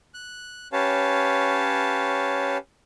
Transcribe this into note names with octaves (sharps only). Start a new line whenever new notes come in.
F#6
C#4 G4 B4 C#5 F5 A5